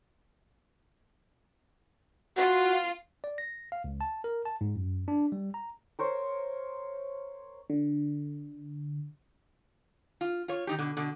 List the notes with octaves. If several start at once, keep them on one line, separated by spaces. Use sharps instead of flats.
F4 F#4 C7
D5
A#6
F5
C#2
A5
A#4
A5
G#2
F#2
D4
G3
A#5
A#4 C5 C#5
D3
F4
F4 C#5
D#3 D#4 G4
B2 D3
B2 D3